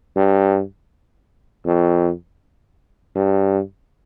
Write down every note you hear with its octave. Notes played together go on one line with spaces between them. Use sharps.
G2
F2
G2